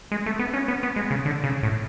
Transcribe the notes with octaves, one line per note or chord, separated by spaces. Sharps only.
G#3
A3
B3
C#4
B3
B3
G#3
C#3
D3
C#3
A2